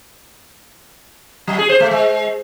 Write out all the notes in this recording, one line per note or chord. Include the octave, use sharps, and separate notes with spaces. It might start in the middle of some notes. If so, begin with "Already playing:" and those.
F#3
G#4
C5
A3
G#3